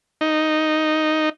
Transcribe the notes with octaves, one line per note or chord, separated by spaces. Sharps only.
D#4